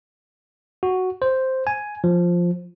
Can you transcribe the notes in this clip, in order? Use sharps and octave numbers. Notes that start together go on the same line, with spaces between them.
F#4
C5
G#5
F3